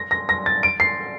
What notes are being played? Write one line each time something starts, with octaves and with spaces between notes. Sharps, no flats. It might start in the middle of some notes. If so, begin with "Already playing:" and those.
Already playing: A#6
A#6
A#6
A6
D7
C7